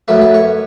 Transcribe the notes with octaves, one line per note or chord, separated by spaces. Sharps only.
F#2 F#3 A3 B4
B4
C#5